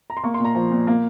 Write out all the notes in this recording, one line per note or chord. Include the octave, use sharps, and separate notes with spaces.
A#5
C6
A#3 C#6
C6
A#2
A#5
F3
A#2
A#3